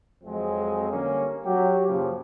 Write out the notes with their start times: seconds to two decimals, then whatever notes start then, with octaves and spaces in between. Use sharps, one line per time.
0.23 F2 F3 F#3 G#3 C4
0.88 D3 G3 A#3 C#4
1.44 F#3 G4
1.87 F#2 A#2 C#3 F3